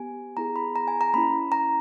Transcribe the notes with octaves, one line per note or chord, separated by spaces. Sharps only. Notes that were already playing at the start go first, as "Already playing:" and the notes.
Already playing: B3 G4 G#5
B3 E4 G#4 A#5
B5
A#5
G#5
A#5
A#3 C#4 E4 B5
A#5